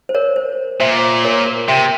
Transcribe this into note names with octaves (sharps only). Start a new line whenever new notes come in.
C5
A#4 C#5
C5
A#2 C5 E5
A#4 C#5
A#4
C3 E5 G5